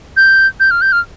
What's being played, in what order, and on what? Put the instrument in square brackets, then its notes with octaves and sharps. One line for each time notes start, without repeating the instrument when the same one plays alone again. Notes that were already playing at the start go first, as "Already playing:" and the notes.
[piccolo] G6
G6
F6
G6
F6